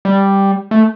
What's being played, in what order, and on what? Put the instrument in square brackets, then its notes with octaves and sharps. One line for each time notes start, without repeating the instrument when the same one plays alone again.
[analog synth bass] G3
A3